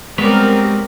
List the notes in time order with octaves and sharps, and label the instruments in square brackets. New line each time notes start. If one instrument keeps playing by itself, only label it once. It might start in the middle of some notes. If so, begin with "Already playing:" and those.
[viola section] G3 A#4 [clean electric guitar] G#3 B4 C#5 [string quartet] B3 C4